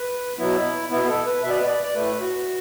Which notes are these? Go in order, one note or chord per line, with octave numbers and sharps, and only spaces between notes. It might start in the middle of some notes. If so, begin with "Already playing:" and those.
Already playing: B4
B2 F#3 B3 E4
B2 B3 E4
A4
B4
B2 B3 D5 E5
B4
D5
D5
A2 A3 B4
F#4